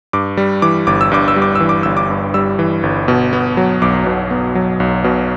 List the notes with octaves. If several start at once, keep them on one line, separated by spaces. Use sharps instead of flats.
G2 D6
G3
E3 D6
G1 D6
E6
G2 D6
E6
G3
D6
E3 E6
D6
G1 E6
D6
G2
G3 E6
E3
G1
B2
B3
F#3
B1 D6
B2
B3
F#3
B1
B2